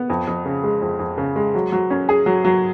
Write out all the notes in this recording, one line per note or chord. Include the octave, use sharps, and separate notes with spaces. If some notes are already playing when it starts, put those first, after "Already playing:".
Already playing: B3
F2
F2
C#3
G#3
F2
F2
C#3
G#3
F#3
F#3
C#4
G#4
F#3
F#3